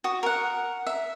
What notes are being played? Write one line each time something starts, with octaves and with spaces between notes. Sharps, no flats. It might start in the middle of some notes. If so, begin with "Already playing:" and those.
F#4 D#6
A#4 F#5
E5